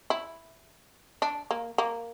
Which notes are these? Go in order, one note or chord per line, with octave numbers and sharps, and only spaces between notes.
E4
D4
A#3
A#3